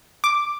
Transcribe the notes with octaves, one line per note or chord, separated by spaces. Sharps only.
D6